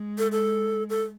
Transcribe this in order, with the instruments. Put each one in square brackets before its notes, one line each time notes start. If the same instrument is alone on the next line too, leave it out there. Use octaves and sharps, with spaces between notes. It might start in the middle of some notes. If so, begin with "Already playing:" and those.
Already playing: [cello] G#3
[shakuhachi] A4
A4
A4